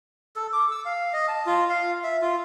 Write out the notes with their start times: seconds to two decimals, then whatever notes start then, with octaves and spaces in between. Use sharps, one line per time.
0.36 A4
0.53 D6
0.71 E6
0.85 F5
1.13 D#5
1.28 A5
1.46 F4
1.70 F5
2.04 E5
2.21 F4